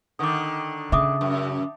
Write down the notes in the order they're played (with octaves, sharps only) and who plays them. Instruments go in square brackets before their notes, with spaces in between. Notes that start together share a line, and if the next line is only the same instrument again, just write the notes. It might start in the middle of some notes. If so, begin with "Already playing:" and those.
[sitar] D3 D#3 [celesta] D6 D#6
[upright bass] C#3 [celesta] E5 D6 D#6
[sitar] F#2